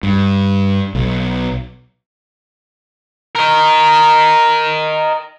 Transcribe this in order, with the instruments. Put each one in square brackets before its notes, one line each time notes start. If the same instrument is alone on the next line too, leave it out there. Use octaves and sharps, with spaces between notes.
[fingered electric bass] G2
B1
[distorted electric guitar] A#4 D#5